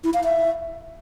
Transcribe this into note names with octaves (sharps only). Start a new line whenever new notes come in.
E4
F5
E5